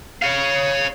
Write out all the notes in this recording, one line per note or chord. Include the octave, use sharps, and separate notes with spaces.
C#5 F5